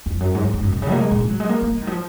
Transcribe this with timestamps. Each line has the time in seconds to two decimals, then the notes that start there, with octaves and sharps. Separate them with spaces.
0.06 F2
0.20 F#2
0.35 G#2
0.44 F#2
0.54 G#2
0.63 F#2
0.72 B2
0.82 C#3
0.92 A#3
1.01 G#3
1.11 A#2
1.20 G#3
1.30 F#3
1.40 G#3
1.49 A#3
1.62 A#3
1.77 G#3
1.82 D#3
1.87 F3